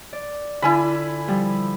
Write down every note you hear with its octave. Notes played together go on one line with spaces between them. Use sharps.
D5
D3 D4 E4 F4 G#5 B5
F3 G3